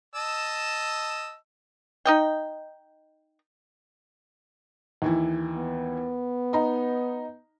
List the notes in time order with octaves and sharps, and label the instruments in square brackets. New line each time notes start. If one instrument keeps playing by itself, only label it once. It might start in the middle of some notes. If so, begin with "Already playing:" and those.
[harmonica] D#5 A5 E6
[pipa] D#4 D#5 G5
[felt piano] D#2 E3 E4
[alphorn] B3
[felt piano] D#4 A#5